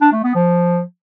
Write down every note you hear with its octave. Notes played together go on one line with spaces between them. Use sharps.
D4
A3
B3
F3